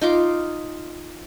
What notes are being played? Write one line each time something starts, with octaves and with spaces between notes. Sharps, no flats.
D#4 F4 D6